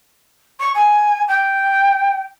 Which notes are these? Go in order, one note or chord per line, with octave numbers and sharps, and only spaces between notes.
C#6
G#5
G5